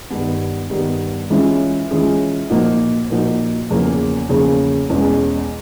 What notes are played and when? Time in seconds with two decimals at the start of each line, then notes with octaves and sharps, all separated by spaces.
0.10 G2 D#3 G3 B3
0.70 G2 D#3 G3 B3
1.30 E3 G#3 C#4 F4 G#4
1.91 E3 G#3 C#4 F4 G#4
2.50 A#2 F3 A#3 D#4 F#4
3.10 A#2 F3 A#3 D#4 F#4
3.70 E2 C#3 F3 A#3
4.29 E2 C#3 F3 A#3
4.90 E2 B2 G#3 C#4